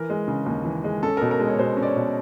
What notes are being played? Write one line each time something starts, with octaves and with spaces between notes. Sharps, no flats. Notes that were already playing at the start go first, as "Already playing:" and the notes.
Already playing: E3 A#4
G#3
C#3
D#2
E3
G#3
C#4 A4
B2 A#4
A#4
G#3
C#5
B2 C5
C#4
D5
C#5
B2